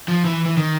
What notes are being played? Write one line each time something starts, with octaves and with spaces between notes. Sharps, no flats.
F3
E3
E3
D#3